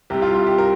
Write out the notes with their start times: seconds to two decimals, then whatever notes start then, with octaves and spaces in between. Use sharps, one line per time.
0.10 C2 C3 G3 G4
0.22 F4
0.34 F4
0.47 G4
0.58 A#4